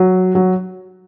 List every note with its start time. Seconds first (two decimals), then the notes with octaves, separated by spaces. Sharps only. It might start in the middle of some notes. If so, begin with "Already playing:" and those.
Already playing: F#3
0.35 F#3